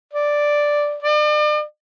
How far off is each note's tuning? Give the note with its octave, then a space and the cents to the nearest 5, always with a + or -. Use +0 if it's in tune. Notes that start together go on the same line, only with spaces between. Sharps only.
D5 +0
D5 +40